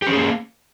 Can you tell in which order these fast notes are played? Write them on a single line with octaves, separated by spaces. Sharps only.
G4 C#4 G#4 A#3